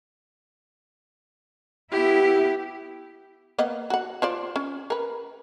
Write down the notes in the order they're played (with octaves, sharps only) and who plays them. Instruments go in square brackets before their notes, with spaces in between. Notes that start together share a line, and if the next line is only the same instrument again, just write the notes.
[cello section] B3 E4 [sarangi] G4
[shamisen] A#3 B3 D#5
F#4 F#5
F4 C5 D5
C#4
A#4 B4